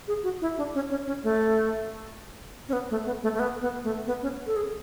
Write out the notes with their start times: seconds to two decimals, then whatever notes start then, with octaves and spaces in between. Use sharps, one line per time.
0.08 G#4
0.24 F#4
0.41 E4
0.57 D4
0.75 C#4
0.90 C#4
1.07 C#4
1.23 A3
2.68 C#4
2.73 B3
2.90 A3
3.06 B3
3.23 A3
3.34 A3
3.39 B3
3.62 B3
3.84 A3
4.07 B3
4.22 C#4
4.46 A4
4.56 G#4